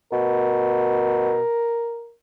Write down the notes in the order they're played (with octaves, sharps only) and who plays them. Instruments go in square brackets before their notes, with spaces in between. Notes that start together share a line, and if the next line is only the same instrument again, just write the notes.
[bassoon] B2 [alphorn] A#4